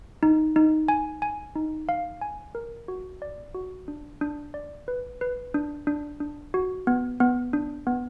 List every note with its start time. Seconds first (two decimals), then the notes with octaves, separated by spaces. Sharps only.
0.23 D#4
0.56 D#4
0.88 G#5
1.22 G#5
1.56 D#4
1.89 F5
2.21 G#5
2.55 A#4
2.88 F#4
3.22 D5
3.55 F#4
3.88 D4
4.21 D4
4.54 D5
4.88 B4
5.21 B4
5.54 D4
5.87 D4
6.20 D4
6.54 F#4
6.87 B3
7.20 B3
7.53 D4
7.87 B3